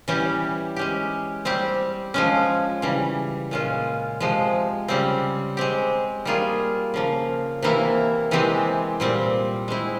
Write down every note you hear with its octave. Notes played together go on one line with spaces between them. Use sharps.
E3 G3 C#4 G4
G#3 C#4 G4
G3 C4 G4
F3 G#3 C#4
C#3 E3 G3
A#2 G#3 C#4 F4
C3 F3 G#3
C#3 G3 C4
G#3 C4 G4
G3 A#3 F4 G#4
C#3 F3 A#3
C3 E3 A#3 E4
C3 E3 G#3 C4 G4
A#2 G3 C4
G#3 C4 E4